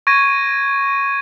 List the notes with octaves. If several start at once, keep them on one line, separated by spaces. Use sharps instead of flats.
C#6 G#6 A#6 D#7